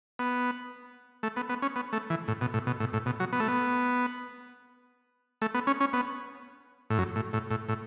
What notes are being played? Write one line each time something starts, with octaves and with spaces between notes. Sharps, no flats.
B3
A3
B3
B3
C#4
B3
A3
E3
A2
B2
A2
B2
A2
A2
B2
F#3
B3
A3
B3
A3
B3
C#4
C#4
B3
A2
F#2
A2
A2
A2
A2